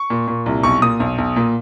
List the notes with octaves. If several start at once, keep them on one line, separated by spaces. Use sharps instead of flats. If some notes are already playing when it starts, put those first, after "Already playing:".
Already playing: C#6
A#2
A#2
C2
B1 C#6
A#2 D#6
B1
B1
A#2